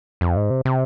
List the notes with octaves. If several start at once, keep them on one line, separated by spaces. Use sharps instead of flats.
F2
G#2
C3
C3